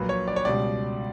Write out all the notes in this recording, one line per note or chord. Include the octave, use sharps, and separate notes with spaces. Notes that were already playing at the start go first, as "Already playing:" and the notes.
Already playing: A#1 A#2 F#3 B4
C#5
D5
C#5
C#2 B2 G3 D5